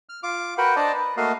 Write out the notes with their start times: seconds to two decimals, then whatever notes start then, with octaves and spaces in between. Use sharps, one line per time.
0.09 F6
0.23 F4 D6
0.58 F#4 A#4 B4 F#5 G5
0.76 D4 C5 D5 D#5 A5 A#5
0.94 B4
1.17 A3 A#3 F#4 D#5 F5